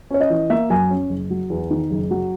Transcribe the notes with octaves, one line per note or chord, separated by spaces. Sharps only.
C#4 C#5
D#5
E3
A#3 E5
F#2 G#5
C#4
F#1
F#3
E2
D#3
F#1
F#3